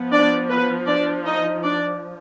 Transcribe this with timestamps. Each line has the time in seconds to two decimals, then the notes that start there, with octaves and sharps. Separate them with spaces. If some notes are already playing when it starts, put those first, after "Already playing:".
Already playing: F3 B3
0.11 D4 D5
0.49 B3 B4
0.87 D4 D5
1.25 D#4 D#5
1.64 D4 D5